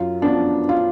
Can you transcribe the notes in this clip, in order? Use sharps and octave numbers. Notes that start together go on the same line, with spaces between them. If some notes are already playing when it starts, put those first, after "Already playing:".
Already playing: F#2 F4
F3 B3 D4
F4